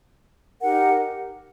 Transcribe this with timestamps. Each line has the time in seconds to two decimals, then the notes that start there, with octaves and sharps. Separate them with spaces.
0.60 D#4 G4 A#4 F#5